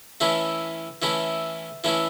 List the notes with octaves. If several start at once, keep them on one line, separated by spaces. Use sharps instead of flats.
E3 A3 C#4 E4
E3 A3 C#4 E4
E3 A3 C#4 E4